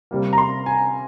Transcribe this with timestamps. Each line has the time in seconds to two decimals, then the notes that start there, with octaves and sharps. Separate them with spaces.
0.11 C3 G3 A#3
0.33 A#5
0.38 C6
0.66 G#5